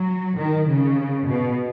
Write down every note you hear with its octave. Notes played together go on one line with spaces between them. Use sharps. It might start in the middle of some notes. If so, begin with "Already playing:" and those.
Already playing: F#3
D#3
C#3
B2